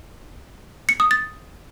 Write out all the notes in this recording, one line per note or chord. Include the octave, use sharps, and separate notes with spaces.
C#7
D#6
A6